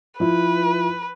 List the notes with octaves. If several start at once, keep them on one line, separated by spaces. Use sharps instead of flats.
F3 E4 B4